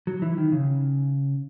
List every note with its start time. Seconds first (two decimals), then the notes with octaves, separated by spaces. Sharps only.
0.07 F#3
0.22 E3
0.38 D#3
0.52 C#3